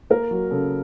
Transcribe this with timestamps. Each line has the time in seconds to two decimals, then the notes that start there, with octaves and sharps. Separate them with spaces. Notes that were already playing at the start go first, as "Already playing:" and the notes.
0.10 A#3 A#4
0.31 F#3
0.51 C#3 A4